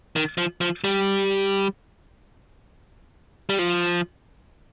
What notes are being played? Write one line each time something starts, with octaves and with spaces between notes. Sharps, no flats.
D#3
F3
F3
G3
G3
F3